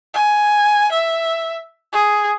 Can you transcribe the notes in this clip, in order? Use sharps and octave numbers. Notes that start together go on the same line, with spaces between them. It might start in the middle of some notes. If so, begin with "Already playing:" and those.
G#5
E5
G#4